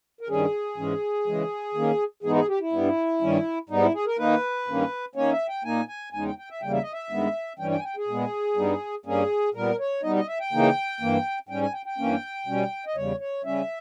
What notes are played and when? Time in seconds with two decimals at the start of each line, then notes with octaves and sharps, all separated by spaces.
0.21 A#4
0.28 G2 D#3 G3 C#4 G#4
0.77 G#2 E3 G#3 C#4
1.26 C#3 E3 G#3
1.74 D#3 A#3 C#4
2.23 G#2 E3 G#3 B3 D#4 G#4
2.36 G#4
2.48 G4
2.60 E4
2.72 G2 G3 B3
3.21 G2 D#3 G3 C#4
3.69 G#2 G3 B3 D#4
3.82 E4
3.94 G#4
4.06 A#4
4.18 D#3 A#3 D#4 B4
4.67 G2 D#3 A#3 C#4
5.15 D#3 A#3 C#4 C#5
5.32 E5
5.48 G5
5.64 A#2 A#3 D#4 G#5
5.88 G#5
6.13 E2 C#3 G#3 D#4 G#5
6.25 G5
6.38 G5
6.50 E5
6.62 E2 C#3 G3 A#3 G5
6.72 E5
6.82 D#5
6.93 E5
7.10 G2 D#3 G#3 B3
7.59 G2 E3 G3 C#4 G5
7.71 G5
7.79 G#5
7.84 G5
7.96 G#4
8.08 A#2 G#3 B3
8.57 G2 G3 B3 D#4
9.06 G2 G3 A#3 C#4 G#4
9.54 A#2 G3 B3 A#4
9.79 C#5
10.03 B2 G3 B3 D#4 D#5
10.16 D#5
10.28 E5
10.40 G5
10.52 C#3 E3 A#3 D#4
11.01 G2 E3 A#3
11.49 G#2 G3 C#4 G5
11.62 G#5
11.73 G5
11.86 G5
11.98 G2 E3 A#3 C#4
12.46 B2 G3 C#4
12.86 D#5
12.96 E2 C#3 G3 C#5
13.20 C#5
13.44 C#3 G3 C#4 E5